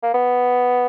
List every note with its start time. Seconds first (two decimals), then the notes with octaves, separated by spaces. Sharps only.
0.03 A#3
0.14 B3